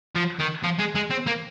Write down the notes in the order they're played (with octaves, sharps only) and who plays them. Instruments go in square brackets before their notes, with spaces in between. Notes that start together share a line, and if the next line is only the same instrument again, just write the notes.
[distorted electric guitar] F3
D#3
F3
G#3
G#3
C4
A#3